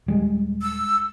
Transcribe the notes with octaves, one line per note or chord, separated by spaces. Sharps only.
D#1 G3 G#3
E6